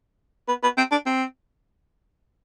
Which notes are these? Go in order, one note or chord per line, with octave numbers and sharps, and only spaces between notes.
B3
B3
C4
D4
C4